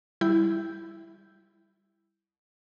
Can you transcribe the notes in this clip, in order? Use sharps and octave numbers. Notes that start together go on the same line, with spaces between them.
G3 E4 G6